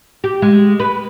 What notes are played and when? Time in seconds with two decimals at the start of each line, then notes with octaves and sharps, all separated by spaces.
0.24 G4
0.42 G#3
0.80 B4